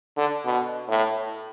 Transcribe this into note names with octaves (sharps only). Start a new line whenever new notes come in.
D3
B2
A2